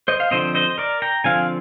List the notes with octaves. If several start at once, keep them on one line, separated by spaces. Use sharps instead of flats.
C5 D#5
F5
D3 F3 C4 C5 D#5
C5 D#5
A#4 D5
G5 A#5
D3 F3 C4 F5 G#5